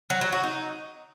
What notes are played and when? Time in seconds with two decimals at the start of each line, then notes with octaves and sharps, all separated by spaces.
0.10 F#3
0.21 F#3
0.32 F#4
0.44 D#4